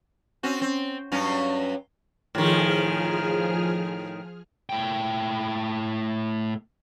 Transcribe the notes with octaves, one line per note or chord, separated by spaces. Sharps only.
C4 C#4 F#4
C4
G2 F#3 C#4
A2 D#3 F3 G#4 F6
A2 G5